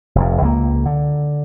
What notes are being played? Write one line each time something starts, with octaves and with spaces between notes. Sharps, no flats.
F1 F2
C#2 G3 A#3
D3